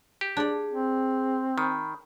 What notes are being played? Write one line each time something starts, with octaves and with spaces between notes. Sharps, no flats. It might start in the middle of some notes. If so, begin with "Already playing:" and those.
G4
D4 G#4 D5
C4
D#3 B5